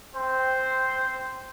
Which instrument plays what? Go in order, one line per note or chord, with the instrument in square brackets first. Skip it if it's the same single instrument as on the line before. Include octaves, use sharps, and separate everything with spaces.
[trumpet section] C4 C5